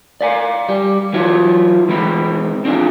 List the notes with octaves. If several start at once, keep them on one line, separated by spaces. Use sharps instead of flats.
D5 F5 G#5
G3
E3 F#3 E4 F4 C#5
E3 G#3 C4 B5
C4 D4 F4 G#4